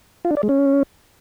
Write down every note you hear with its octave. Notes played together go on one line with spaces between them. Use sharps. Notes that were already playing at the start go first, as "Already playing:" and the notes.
F4
D4
D5
G#3
C#4